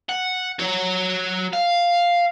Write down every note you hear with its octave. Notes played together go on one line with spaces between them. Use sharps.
F#5
F#4 C#5
F5